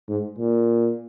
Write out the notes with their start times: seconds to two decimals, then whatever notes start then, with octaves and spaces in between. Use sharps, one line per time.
0.09 G#2
0.38 A#2